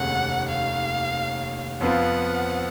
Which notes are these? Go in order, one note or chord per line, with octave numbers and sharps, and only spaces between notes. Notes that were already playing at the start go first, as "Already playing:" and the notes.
Already playing: F1 D#2 C#3 F#5
F5
F2 F3 B3 F4 F#5